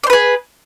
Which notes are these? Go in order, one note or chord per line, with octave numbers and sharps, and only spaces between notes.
G#4 B4 C5 D5